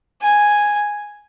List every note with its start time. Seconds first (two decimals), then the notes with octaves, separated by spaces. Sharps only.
0.22 G#5